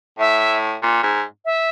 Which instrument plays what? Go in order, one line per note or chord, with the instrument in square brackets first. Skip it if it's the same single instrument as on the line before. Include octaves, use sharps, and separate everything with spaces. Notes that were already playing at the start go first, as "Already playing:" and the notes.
[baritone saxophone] A2 [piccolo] E5
[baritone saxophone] A#2
G#2
[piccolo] E5